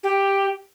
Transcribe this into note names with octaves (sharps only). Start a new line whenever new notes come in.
G4